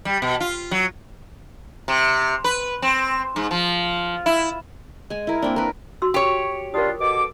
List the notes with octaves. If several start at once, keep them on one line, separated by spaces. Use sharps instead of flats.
G3
B2
F4
F#3
C3
B4
C4
G#2
F3
E4
G#3 G#5
E4 A#4
A#3 C4 D4
A#4 B4
F#4 C6 E6
G4 C#5
G3 D4 F4 A#4 D#6
B2 A4 D6